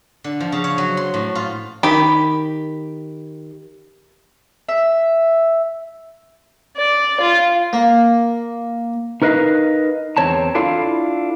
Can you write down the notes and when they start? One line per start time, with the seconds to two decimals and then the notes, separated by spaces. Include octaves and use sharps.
0.24 D3
0.40 F3
0.52 C#3
0.64 C#5
0.78 F#3
0.97 C6
1.14 A2
1.35 F4
1.83 D#3 G4 B5
4.69 E5
6.77 D5
7.20 F4
7.73 A#3
9.22 D#4 A#4 B4 D#5 F5
10.17 E2 C4 C#5 A5 A#5
10.55 D4 E4 F4 A4 F5